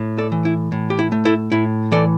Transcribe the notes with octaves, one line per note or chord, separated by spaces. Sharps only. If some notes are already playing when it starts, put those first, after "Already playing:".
Already playing: A2
A4 D5
E3
E4
A2
G4
E4
A3
E4 A4
A2 E4
E3 A4 D5